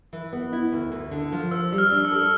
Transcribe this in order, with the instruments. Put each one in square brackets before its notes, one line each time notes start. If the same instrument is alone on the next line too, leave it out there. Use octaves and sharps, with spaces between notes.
[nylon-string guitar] E3
B3
E4
D2
D2
D3
F3
[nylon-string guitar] C5 [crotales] E6
[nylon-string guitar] G3
[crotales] F6
[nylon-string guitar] D4
[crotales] E6
[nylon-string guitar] A4